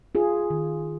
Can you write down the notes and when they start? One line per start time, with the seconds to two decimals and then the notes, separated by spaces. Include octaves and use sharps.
0.15 F4 G#4
0.50 D#3